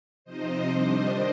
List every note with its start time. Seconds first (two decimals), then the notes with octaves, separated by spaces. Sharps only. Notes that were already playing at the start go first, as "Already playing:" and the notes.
0.25 C3 F3 C4 D#4 C5 D#5
0.69 D#3 G3 D4 C5 D#5